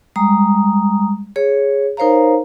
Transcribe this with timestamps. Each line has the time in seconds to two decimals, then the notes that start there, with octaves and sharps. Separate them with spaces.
0.16 G3 G#3 A#5 D#6
1.36 G#4 C#5
1.97 D#4 A#4 C5 C#5 F5 A#5